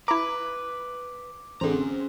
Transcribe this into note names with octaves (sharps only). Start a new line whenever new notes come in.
E4 B4 A#5 D6
A1 D3 C4 C#4 G#4 C5 A#5